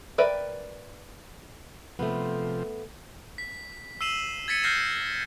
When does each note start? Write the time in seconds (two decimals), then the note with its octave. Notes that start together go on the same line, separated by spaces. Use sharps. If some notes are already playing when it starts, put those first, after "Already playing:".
0.18 A#4 B4 D5 E5 G5
1.99 C3 F3 A3 B3
3.38 B6
4.01 E6 C7 D#7 E7 F#7
4.48 G#6 A6 B6 C#7 D#7
4.63 F6 G6 A#6 C7 E7